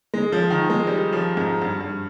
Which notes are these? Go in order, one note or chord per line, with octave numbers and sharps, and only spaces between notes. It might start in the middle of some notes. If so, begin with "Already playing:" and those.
G#3
F3
D#3
G#3
G3
F3
G#2
G2
G2